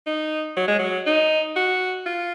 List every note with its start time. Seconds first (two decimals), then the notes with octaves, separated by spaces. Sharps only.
0.07 D#4
0.57 F#3
0.68 G#3
0.79 F#3
1.06 D#4
1.56 F#4
2.06 F4